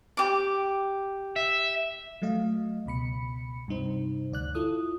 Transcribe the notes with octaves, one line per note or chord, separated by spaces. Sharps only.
G4 D6
E5
F#3 A3 D#5 F5
C#2 B2 B5 C#7
G2 C3 D#4 C5
D2 D5 F#6
E4 F4 A4 D#6